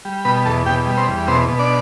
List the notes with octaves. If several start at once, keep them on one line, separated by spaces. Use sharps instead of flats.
G3
B2 B4 B5
E2 A4 A5
B2 G4 G5
G3
C4 C5
E2
B2 C4 C5
B2
D4 D5